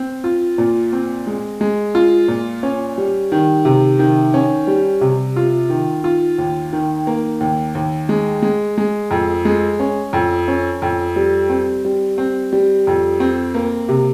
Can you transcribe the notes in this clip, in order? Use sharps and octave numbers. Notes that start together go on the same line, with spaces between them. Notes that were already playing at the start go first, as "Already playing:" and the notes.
Already playing: C4
F4
A#2
C4
G#3
G#3
F4
A#2
C#4
G3
D#3
C3
D#3
C#4
G3
C3
F4
D#3
F4
D#2
D#3
A#3
D#2
D#2
G#3
G#3
G#3
F2
G#3
C#4
F2
C#4
F2
G3
C4
G3
C4
G3
F2
C4
A#3
C3